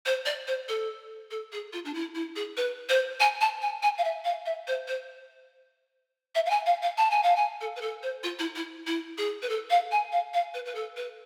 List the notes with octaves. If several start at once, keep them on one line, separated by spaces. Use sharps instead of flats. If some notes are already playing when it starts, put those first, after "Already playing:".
C5
D5
C5
A4
A4
G#4
F4
D4
E4
E4
G#4
B4
C5
G#5
A5
G#5
G#5
F5
E5
F5
E5
C5
C5
E5
F5
G#5
F5
F5
A5
G#5
F5
G#5
A4
B4
A4
C5
F4
E4
E4
E4
G#4
B4
A4
F5
G#5
F5
F5
B4
B4
A4
B4